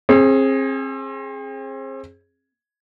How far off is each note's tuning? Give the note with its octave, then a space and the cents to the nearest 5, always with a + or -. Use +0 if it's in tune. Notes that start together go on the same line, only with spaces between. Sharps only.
C4 +35 G#4 +0